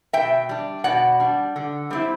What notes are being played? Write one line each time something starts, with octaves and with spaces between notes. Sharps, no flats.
B2 E5 G5
G3 D4
B2 D5 F#5
G3 D4
D3
G3 C4 E4